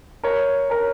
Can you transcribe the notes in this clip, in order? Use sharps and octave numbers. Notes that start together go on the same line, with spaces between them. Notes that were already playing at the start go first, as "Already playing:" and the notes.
A#4 C#5
A#4 C#5